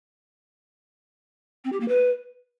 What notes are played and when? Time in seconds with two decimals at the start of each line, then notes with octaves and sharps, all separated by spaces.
1.65 C4
1.73 G4
1.80 A#3
1.88 B4